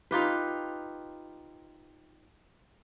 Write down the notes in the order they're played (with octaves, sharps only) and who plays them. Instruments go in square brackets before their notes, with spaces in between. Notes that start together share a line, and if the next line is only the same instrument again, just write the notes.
[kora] D#4 F4 G4 B4